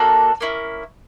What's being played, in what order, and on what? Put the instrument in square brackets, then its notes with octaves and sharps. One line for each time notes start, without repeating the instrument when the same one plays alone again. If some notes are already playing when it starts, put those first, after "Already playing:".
Already playing: [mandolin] A#3 D4 F#4 A4
A#3 C#4 E4